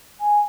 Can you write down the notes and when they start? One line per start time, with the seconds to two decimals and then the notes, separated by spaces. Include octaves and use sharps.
0.20 G#5